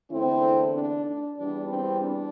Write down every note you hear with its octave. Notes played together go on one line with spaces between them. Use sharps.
E2 D3 A3 C4 E4
D4
D4
E2 E3 G3 D4
C4
D4